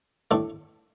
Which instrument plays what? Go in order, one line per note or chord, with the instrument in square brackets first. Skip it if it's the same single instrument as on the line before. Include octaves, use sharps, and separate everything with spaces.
[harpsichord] A2 A3 D4